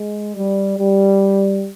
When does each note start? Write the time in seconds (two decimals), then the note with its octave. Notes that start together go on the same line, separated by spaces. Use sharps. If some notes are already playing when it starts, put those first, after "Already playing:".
Already playing: G#3
0.35 G3
0.78 G3